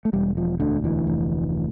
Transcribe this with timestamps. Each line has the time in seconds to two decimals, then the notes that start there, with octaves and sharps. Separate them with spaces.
0.05 A3
0.13 E1 G3
0.37 F3
0.60 D2 D3
0.84 E3
1.07 F1